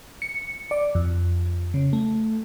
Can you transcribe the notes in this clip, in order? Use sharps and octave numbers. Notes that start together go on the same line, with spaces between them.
C#7
D5
F2
C#3
A3